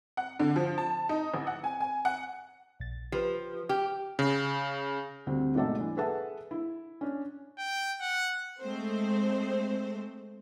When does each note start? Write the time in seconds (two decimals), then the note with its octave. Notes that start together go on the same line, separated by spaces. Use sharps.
0.17 F#5
0.39 D3
0.56 F3
0.78 A5
1.09 D#4
1.34 A1
1.47 F#5
1.64 G#5
1.80 G#5
2.05 F#5
2.80 A#1 A6
3.12 F3 G4 B4
3.69 G4 D6 F6
4.19 C#3
5.26 D2 G3 C4
5.55 G#2 B2 A3 A4 D5 A5
5.78 E3 D4
5.97 G#4 A4 B4 E5 F#5 A5
6.51 E4
7.01 C#4 D4
7.58 G5
8.01 F#5
8.61 G#3 A3 C4 C5